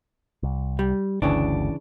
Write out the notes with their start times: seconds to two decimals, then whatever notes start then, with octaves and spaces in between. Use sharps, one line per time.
0.43 C2
0.79 G3
1.22 G1 D2 C#3 E3 D4